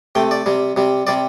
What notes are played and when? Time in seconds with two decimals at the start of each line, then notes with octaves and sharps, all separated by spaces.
0.15 C3 A3 G5
0.31 D5
0.46 C3 G3
0.77 C3 G3
1.07 C3 G3 D5